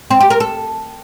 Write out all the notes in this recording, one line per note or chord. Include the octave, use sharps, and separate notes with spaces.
C4
G4
A#4
A4